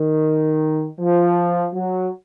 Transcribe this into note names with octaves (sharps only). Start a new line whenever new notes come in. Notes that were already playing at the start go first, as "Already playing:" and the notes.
Already playing: D#3
F3
F#3